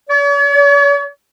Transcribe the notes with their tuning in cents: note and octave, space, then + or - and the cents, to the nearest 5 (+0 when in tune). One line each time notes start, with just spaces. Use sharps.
C#5 +45